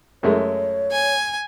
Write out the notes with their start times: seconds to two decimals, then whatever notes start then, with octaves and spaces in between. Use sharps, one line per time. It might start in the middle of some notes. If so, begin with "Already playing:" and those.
0.23 F#2 G#3 A3 C#5
0.92 G#5